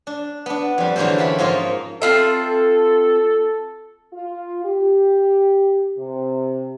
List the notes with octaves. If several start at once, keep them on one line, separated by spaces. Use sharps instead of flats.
D4
B3 D4
F2 G3
E2 D3 F#3 A#3 A4 C5
F#2 F4 G4 E5 B5
G#2 F3 A#3 F4 C#5 D#5
C4 F4 A4 E5
F4
G4
C3